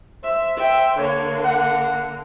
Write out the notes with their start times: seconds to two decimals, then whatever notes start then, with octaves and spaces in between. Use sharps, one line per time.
0.24 C5 E5
0.57 E5 G5
0.97 D3 A#3 C#5
1.45 F#5